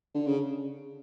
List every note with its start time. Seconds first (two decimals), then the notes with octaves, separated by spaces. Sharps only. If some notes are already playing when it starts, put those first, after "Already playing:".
0.14 D3
0.27 C#3